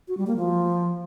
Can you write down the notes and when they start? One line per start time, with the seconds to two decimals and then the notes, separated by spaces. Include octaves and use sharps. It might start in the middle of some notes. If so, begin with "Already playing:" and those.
0.08 F#4
0.17 G3
0.27 A#3
0.36 F3